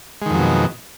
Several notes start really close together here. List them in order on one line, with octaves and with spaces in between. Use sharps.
G#3 D#3 F2 F#3 B2